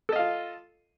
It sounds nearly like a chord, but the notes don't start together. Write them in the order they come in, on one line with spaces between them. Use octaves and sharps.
A4 D#5 F5 F4